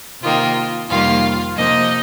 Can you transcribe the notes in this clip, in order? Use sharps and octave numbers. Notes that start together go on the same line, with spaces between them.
C3 D#3 A#3 F4
F2 C3 D#3 G3 A#3 F4 F5
C3 F3 A#3 D#4 D#5